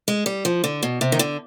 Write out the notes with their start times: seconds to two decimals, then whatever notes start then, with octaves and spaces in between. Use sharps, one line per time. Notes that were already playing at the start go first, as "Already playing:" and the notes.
0.08 G#3
0.26 G3
0.45 F3
0.64 D3
0.83 B2
1.01 C3
1.12 D#3
1.19 D3